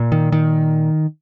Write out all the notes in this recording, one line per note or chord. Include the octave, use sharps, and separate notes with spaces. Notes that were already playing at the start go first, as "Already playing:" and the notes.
Already playing: A#2
D#3
D#3